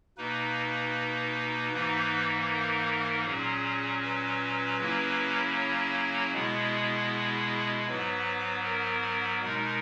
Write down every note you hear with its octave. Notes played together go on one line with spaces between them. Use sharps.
B2 A#3 D#4 B4
G#2 E3 A#3 D#4
A#4
A#2 F#3 C#4 G#4
B4
C#3 F#3 A#3 C#4 E4
C#5
B2 G#3 B3 E4 G#4
G#2 F#3 B3 B4
A#4
B2 G#3 D#4 A#4